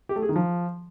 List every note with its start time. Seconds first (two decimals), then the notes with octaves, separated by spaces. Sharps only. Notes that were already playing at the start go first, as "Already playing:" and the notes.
0.09 G4
0.16 A3
0.22 G#4
0.29 D#3
0.36 F3